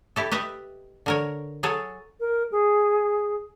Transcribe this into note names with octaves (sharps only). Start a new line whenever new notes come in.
E4 G4 A4
G4 B4 D#5 E5
D3 A#4 C#5
F#3 G#4 A4 C#5
A#4
G#4